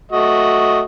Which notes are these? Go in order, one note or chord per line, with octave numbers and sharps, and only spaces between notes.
A3 F#4 D#5